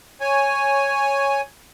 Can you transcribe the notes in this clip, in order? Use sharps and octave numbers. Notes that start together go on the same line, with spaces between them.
C#5 G#5